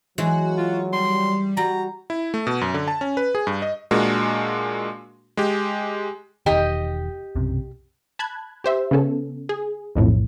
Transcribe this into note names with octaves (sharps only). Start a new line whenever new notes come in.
E3 F#3 G#3 F#4
F4
G3 C6
G3 F#4 A#5
E4
A3
B2
F#2
D3
A5
C#4
B4
G#4
G2
D#5
A#2 G#3 D4 F#4 A#4
G#3 G4
E1 D#3 G4 D#5
B1 F#2 C3
A5 B5 F#6 G#6
G4 C5 E5
C#3 B3 C#4 A4
G#4
B1 F2 A2